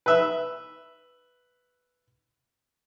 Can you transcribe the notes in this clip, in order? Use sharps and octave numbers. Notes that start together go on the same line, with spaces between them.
B4 E5